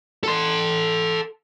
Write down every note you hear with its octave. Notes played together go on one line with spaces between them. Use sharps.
A4 C6